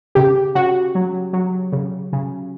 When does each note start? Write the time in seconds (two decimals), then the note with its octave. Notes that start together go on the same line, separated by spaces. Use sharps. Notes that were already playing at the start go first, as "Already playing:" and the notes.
0.15 C#3 G4
0.55 C#3 F#4
0.95 F#3
1.33 F#3
1.72 C#3
2.13 C#3